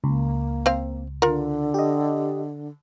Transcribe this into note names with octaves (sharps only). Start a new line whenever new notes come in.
C#2 A#3
C4 F5
D3 F4 A#4
G4 D#5